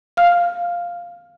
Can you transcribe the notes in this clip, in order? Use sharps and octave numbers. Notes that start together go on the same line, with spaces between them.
F5 F6